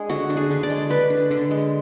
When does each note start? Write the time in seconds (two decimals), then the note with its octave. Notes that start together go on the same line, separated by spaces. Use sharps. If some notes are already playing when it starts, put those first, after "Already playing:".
Already playing: G#3 D4 G#4
0.10 D3 F#4
0.30 D4
0.37 G#4
0.51 D3
0.63 D5
0.70 G#3
0.90 D3 B4
1.10 D4
1.31 D3
1.51 G#3